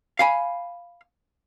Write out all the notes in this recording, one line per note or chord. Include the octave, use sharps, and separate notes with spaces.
F5 G#5 B5